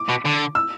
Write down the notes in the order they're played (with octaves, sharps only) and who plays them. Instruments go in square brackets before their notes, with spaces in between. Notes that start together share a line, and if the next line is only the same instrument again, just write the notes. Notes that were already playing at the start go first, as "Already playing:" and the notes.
Already playing: [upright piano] D6
[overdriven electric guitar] B2
D3
[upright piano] E6